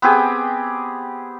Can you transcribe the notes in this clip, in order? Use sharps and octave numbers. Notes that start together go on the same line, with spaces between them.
B3 C4 G4 G#4